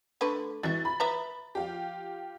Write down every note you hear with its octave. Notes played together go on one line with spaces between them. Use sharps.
D3 A3 B4
E3 F#4 E5 A6
B5
B4 E5 A#5
F3 F4 G4